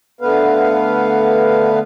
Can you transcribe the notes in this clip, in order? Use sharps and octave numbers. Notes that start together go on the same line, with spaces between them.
D3 A3 B3 B4 F5